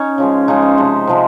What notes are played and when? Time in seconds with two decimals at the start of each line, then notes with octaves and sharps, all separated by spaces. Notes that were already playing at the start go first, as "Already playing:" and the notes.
Already playing: C#4 D#4
0.18 C#3 F3 G#3
0.48 C#3 F3 G#3 D#4
0.62 C5
0.78 C3 F3 G#3
1.07 C3 F3 G#3